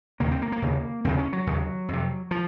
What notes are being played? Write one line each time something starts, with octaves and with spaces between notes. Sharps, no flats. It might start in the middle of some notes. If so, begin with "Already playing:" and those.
D#2 C#3 A#3
C4
A#3
A#3
D#2 C#3
D#2 C#3 C4
C#4
F#3
D#2 C#3
F2 C3
F3